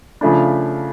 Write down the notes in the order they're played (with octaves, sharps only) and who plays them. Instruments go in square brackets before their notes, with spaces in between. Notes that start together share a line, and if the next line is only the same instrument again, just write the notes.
[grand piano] C#3 F3 A3 D4